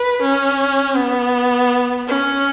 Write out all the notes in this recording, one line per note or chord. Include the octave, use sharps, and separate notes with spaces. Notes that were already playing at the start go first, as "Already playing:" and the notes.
Already playing: B4
C#4
B3
C#4